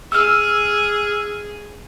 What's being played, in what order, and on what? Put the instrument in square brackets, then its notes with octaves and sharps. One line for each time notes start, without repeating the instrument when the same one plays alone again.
[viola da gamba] G#4 [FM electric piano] E6 F6